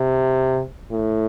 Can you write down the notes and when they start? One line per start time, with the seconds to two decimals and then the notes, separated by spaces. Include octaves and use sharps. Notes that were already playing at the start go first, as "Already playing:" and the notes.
Already playing: C3
0.91 A2